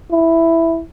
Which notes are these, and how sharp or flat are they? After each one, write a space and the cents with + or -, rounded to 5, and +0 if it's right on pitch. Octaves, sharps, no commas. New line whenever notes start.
E4 +0